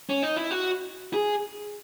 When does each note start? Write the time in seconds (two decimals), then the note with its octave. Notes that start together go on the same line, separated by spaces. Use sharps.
0.10 C#4
0.23 D#4
0.36 E4
0.51 F#4
1.14 G#4